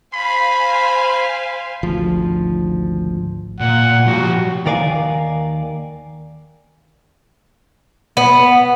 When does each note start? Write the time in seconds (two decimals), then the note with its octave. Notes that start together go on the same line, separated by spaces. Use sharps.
0.14 C5 F5 G#5 B5
1.83 G#1 D2 F3
3.60 A#2 F#5
4.07 F3 F#4 G4
4.66 D#2 D#3 A#4 D5 F5 G#5
8.17 B3